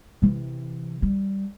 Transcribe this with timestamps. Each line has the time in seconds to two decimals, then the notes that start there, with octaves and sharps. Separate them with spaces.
0.22 C3 E3
1.02 G3